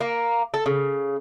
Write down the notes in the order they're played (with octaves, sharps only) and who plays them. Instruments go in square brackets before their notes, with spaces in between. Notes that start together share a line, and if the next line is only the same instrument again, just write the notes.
[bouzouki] A#3
A4
C#3